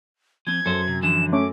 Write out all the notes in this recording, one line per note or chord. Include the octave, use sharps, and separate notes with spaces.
F3 C4 G#6
F#2 A4 C5
C3
D3 E3 F3 E7
A3 C#4 D6